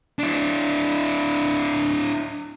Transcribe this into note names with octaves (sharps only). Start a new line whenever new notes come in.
D4 E4